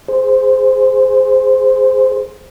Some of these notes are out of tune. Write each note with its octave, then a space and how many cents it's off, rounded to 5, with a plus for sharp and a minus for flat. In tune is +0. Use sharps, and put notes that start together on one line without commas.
G#4 +0 C5 -10